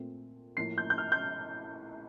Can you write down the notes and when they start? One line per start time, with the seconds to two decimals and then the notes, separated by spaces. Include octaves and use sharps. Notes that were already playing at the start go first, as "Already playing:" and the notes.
Already playing: A#2 A3 C4
0.57 A2 F3 A#3 C7
0.78 G6
0.90 G6
0.98 F6
1.12 G6